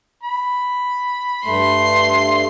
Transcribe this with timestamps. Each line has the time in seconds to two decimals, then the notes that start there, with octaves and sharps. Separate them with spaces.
0.23 B5
1.45 G2 A3 C6